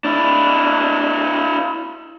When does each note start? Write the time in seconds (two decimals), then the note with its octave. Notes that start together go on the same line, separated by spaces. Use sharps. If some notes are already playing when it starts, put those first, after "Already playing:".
0.05 D4 E4